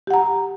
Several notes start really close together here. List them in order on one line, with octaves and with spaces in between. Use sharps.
G4 F#5 A#5